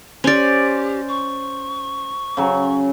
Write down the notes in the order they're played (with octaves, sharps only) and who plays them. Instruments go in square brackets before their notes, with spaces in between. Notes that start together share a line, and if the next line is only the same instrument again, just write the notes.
[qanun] C#4 D5 [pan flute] G4 [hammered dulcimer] C5
[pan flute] C#6
[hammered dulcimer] C#3 F#3